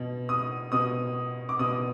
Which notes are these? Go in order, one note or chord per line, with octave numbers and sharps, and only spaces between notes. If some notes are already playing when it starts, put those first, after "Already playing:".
Already playing: B2
D#6
B2 D#6
D6
B2 D#6